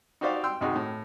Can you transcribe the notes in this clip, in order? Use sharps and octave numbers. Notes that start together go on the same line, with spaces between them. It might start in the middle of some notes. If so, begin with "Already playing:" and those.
D#4 F#4 G4 C5 D5 F5
G5 C6 E6
D#2 C3 D#4 F#4 G#4
A2